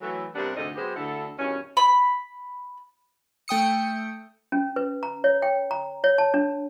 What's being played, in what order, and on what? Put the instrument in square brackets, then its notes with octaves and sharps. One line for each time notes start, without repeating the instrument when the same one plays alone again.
[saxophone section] E3 F#3 A3
C3 G3 A#3 B3 D4
D2 G#2 C3 D#4 A4 D#5
F#3 G#3 B3 G4 G#4 C5
D2 D3 E4 A4
E2 G2 B2 D#3 C#4
[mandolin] B5
[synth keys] A3 G5 D#6 C#7
[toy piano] C#4
B4
A#5
C#5
G5
A#5
C#5
A5
D4